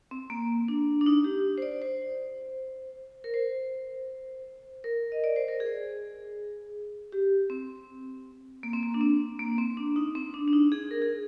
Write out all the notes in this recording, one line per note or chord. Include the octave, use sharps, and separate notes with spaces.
C4
A#3
D4
D4
D#4
G4
C5
D5
C5
A#4
C5
A#4
D#5
D5
C5
A#4
G#4
G4
C4
A#3
C4
A#3
D4
C4
A#3
C4
D4
D#4
C4
D4
D4
D#4
G#4
A#4
G#4